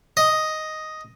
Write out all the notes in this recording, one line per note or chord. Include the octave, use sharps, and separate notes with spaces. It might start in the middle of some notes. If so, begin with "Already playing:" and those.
D#5